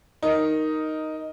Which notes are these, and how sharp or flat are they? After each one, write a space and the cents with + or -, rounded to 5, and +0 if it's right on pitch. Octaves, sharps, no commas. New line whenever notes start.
D#4 +0 A#4 +0